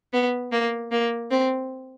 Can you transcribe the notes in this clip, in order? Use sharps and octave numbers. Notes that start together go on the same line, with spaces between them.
B3
A#3
A#3
C4